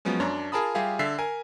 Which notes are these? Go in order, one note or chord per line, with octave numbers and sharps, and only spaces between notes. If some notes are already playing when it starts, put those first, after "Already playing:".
F3 F#3 G#3 B3 C#4
F#2 D4 C#5 A#5
F4 G#4 A#4 A5 B5 D#6
G3 F4 G4 G#4 E5 F5
D3 E5 A6 B6 C7
A#4 G#5